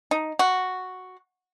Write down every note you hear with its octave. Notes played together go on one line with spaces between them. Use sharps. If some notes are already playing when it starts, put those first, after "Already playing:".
D#4
F#4